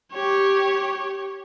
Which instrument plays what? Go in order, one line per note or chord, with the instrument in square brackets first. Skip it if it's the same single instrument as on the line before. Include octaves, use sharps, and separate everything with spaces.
[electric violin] G4 C#5